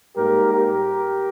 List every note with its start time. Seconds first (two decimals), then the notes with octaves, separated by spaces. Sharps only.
0.15 G#2 G3 A#3 G4 A#4
0.53 G4 A#4